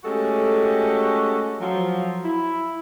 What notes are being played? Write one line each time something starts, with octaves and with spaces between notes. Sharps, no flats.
G#3 A3 C#4 F#4 G4 A4
F3 F#3
E4